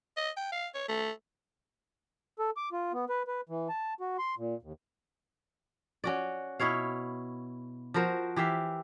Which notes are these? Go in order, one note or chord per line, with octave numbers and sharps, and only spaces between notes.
D#5
G5
F5
C#5
A3
A4
D6
F4
B3
B4
B4
E3
A5
F#4
C6
A#2
D#2
C#4 F#4 D5
B2 E4 C#5 F5
F3 F#4 A#4 C5
E3 G4 E5 F5